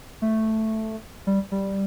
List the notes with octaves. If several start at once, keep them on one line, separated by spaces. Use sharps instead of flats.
A3
G3
G3